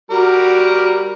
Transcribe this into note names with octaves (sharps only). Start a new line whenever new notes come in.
G3 F#4 A#4